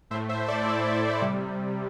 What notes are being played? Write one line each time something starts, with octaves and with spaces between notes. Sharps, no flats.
A2 A3 C5 E5
C5 E5
A4 D5
E4 A4
C3 G3